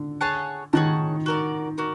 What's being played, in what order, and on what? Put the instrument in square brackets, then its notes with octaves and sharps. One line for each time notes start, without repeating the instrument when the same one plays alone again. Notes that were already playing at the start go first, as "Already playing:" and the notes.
Already playing: [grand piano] D3
[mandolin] G#4 C#5 F#5 A5
[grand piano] D#3 [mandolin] G#4 C#5 F#5 A5
[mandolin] F#4 A#4 D5
F#4 A#4 D5